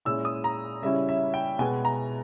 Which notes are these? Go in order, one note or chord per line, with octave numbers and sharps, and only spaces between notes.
A#2 G#3 C#4 E4 E6
D#6
A#5
C#3 G3 C#4 E4 E5
E5
G5
B2 G#3 B3 G#5
A#5